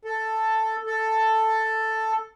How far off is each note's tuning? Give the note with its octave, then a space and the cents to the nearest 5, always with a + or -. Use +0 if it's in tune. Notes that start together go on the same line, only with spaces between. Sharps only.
A4 +5
A4 +5